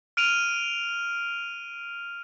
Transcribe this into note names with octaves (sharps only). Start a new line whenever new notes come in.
F6 D7 D#7 F7